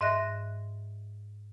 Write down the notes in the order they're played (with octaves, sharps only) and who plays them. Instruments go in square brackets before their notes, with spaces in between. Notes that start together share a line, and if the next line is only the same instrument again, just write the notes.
[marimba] G#2 D#5 E5 F#6 A#6